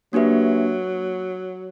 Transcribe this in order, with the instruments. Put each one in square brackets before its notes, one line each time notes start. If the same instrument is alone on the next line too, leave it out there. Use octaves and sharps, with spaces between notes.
[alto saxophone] F#3 [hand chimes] A#3 D4 G4 B4 E5